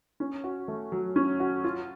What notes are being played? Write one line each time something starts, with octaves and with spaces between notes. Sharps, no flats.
C#4
F#4
A3
F#3
C#4
F#4
F4